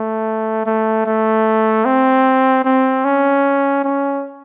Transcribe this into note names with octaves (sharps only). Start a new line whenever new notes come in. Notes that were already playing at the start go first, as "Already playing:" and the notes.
Already playing: A3
A3
A3
C4
C4
C#4
C#4